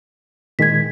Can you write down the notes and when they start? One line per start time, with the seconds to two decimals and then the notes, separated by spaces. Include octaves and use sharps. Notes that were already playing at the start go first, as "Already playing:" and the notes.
0.59 A#2 D#3 G#3 G#6 B6